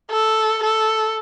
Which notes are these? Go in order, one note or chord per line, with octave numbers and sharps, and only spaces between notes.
A4
A4